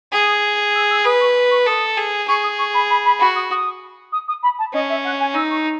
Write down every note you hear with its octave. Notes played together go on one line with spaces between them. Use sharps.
G#4 D#6
E6
E6
B4 D#6
C#6
C#6
A4 D#6
G#4
G#4 C#6
D#6
C#6
B5
B5
B5
F#4 B5
D#6
D#6
D#6
D#6
B5
A5
C#4 D#5
E5
F#5
G#5
D#4 E6
C#6